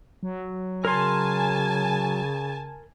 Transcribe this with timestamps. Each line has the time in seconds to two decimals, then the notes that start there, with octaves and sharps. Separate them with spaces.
0.23 F#3
0.85 C#3 A#4 G#5 A5 C6